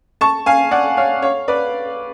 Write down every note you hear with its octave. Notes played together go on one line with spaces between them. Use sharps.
A5 C#6
F5 G#5
D5 F#5
C#5 F5
C#5 F5
B4 D5